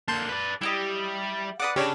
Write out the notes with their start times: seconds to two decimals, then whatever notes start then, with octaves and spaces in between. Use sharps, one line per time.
0.08 D3 A#3 A5 C6 G6
0.29 B4 D5
0.61 G3 E4 G4 D#5
1.60 B4 D5 F#5 D6 D#6
1.76 C#3 C#4 D4 G4 C#5 D5